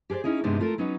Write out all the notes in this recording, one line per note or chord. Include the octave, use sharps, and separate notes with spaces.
G4 G#4 A#4 C5 D5
C#4 D#4 E4 G#4
G2 C3 G#3 B3 D4 D#4
A3 F4 A4 A#4
F#3 B3 C#4 D#4 B4